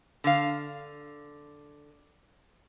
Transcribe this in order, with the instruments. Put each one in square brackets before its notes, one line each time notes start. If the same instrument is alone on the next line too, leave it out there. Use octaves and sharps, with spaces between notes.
[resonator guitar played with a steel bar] D3 F5